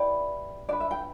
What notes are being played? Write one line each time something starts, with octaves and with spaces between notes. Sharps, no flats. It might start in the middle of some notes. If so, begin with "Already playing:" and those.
Already playing: E4 G4 B4 D5
D4 B4 D5
E5
G5